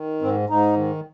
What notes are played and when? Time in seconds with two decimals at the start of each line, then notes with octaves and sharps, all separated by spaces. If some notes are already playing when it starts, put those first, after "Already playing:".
Already playing: D#3
0.22 G#2 C4
0.49 G#2 D#4
0.77 D#3